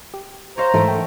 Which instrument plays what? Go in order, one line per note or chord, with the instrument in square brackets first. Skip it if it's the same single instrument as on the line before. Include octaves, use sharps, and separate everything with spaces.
[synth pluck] G4
[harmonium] C5 A#5 [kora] C#5 F5
[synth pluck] G#2 E3 [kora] A3 A#4 E5
[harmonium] D3 [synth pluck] G5